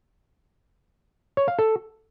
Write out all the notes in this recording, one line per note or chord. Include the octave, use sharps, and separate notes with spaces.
C#5
F5
A4